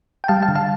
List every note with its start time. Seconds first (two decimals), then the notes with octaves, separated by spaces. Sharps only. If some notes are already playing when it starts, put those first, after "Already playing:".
0.24 G5
0.28 G3 F5 A5
0.42 F5 A5
0.48 D3
0.55 F5 A5